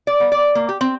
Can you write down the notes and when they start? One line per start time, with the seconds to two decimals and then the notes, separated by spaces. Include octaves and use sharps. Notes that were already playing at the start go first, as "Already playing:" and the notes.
0.07 D5
0.20 B3
0.32 D5
0.55 A#3
0.69 G4
0.81 C4